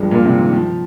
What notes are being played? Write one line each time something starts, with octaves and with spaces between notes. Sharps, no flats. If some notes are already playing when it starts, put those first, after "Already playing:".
Already playing: G2 F3 G3 G#3
A#2 A#3
C3 C4
D#3
F3